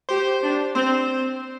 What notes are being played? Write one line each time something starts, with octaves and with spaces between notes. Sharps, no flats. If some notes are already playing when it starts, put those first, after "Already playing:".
G4 C5
D4
C4 C5